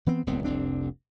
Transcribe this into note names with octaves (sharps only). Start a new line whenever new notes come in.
E3 B3 C4
D#1 C#2 B3 C4
F1 C2 C4 D4